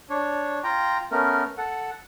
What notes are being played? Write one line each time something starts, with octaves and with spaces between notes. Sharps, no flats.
D4 C#5
F4 G5 A#5
A3 B3 C#4 A#4
A4 F#5